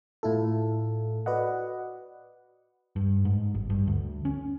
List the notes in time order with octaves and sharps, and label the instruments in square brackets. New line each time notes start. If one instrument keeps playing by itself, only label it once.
[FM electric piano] A2 E4 F4 A4
F#4 B4 D5 D#5 F#5
[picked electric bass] G2
G#2
G#1
G2
D2
C#4